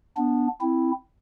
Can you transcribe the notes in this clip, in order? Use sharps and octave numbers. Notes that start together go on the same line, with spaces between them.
B3 D4
C4 E4